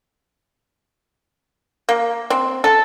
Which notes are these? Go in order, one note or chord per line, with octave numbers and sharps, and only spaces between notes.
A#3
C4
A4